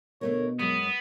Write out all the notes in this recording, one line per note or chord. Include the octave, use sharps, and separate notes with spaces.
D2 B2 A3 A#4 C#5
F#2 G#3 B3 C#4 D#6